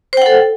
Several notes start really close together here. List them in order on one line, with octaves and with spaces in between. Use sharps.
C5 G5 F#5 A4